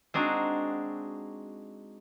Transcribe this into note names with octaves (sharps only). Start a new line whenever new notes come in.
G#3 C4 D4 D#4 F#4